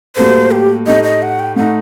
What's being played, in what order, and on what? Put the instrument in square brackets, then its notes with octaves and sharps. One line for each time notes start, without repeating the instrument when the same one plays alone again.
[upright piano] A2 G3 A#3 F#4 A4 [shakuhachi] C5
[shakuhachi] G4
[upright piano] A2 A3 D#4 G4 [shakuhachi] D#5
[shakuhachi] D#5
F#5
G5
[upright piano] A2 A3 D#4 [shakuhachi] F#5